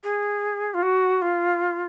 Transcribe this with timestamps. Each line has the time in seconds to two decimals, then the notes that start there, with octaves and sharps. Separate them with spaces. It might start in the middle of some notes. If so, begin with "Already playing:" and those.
0.04 G#4
0.74 F4
0.82 F#4
1.22 F4